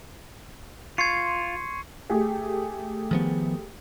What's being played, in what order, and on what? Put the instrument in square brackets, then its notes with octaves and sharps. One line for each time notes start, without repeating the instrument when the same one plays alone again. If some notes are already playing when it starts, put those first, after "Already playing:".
[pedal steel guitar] F4 [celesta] C6 [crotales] C#6 [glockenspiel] G#6 C7 C#7
[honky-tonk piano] A3 G4 G#4
[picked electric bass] D#3 F3 B3